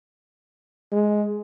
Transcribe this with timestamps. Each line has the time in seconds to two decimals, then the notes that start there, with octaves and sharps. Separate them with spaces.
0.92 G#3